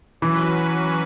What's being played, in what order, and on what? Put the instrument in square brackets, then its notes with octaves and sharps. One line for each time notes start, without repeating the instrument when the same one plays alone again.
[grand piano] E3 [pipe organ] F#3 C#4 F#4 B4